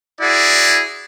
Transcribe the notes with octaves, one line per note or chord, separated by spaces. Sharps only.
E4 F#4 G#4 D5